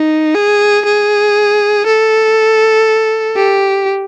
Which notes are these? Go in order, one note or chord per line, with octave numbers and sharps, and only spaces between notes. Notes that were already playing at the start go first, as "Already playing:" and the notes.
Already playing: D#4
G#4
G#4
A4
G4